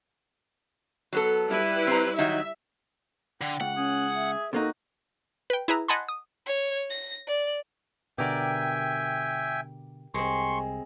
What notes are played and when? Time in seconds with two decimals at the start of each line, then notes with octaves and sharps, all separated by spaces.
1.13 F#3 B3 A4
1.49 G3 E4 B4
1.87 C4 A#5
2.18 D#3 F#3 D#4 E5
3.41 D3 G5
3.61 C#2 F#5
3.76 C#4 G#4
4.15 E5
4.53 C3 A#3 D#4 F#4 A4
5.50 B4 G5
5.68 E4 G#4 B4 A#5
5.88 D#5 F#5 G#5 A5 B5 C6
6.09 D#6
6.46 C#5
6.90 A#6
7.27 D5
8.18 B2 D3 G4 A#4 D5 E5 G5 G#5
10.14 C2 G#3 C4 C6 C#6